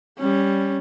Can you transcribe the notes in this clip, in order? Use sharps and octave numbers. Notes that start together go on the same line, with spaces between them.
G3 C#4